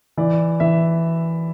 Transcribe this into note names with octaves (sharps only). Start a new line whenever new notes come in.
E3 D5
E3 E5